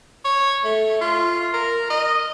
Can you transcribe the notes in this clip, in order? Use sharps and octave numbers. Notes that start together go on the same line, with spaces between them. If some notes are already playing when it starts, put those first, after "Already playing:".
C#5
A3
F4
A#4
D#5